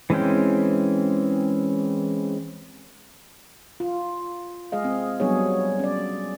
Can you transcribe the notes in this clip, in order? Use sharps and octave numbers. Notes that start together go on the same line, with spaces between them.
E3 G#3 C4 C#4 G5
F4
G#3 G#4 D#5 F5
C4
F#3 G3 B3 D4 G#4 C#5
C#4 D5